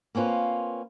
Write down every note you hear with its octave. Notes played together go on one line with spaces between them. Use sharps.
A#3 C4 C#4 F4 B4